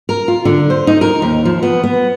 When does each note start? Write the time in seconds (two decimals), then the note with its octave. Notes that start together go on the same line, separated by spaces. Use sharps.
0.09 A#4
0.28 F4
0.45 D3
0.70 C5
0.87 D#4
1.01 A#4
1.22 D#2
1.45 F3
1.63 B3
1.84 B3